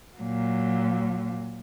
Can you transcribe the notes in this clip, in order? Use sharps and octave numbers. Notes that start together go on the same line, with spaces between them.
A#2 F#3